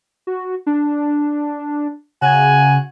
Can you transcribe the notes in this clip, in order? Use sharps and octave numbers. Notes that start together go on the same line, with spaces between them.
F#4
D4
C#3 F#4 G#5